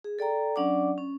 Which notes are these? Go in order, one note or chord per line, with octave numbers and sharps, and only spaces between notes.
G#4
A4 D5 G5 A#5
F#3 C#4 D4 D5 F#5 D6
C#4